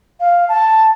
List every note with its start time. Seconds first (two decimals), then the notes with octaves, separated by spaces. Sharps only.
0.20 F5
0.49 A5